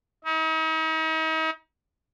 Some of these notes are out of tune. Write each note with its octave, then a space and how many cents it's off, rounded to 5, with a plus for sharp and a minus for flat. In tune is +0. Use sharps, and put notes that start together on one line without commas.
D#4 +40